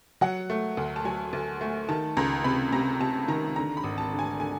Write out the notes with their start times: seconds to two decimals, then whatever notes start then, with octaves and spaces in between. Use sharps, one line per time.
0.21 F#3 F#5
0.50 A3
0.77 D2
0.96 A5
1.05 F#3 G#5
1.33 D2
1.61 A3
1.89 D#3 A5
2.17 C#2 A#5
2.44 C3 B5
2.72 C3 A#5
3.00 C3 A5
3.28 D#3 A#5
3.56 D3 A#5
3.77 B5
3.84 G#1
3.98 A5
4.12 D3
4.19 G#5
4.40 D3 G#5